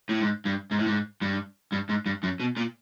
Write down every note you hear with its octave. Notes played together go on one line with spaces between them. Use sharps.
A2
G#2
G2
G#2
A2
G#2
G2
G2
G#2
G2
F#2
B2
A#2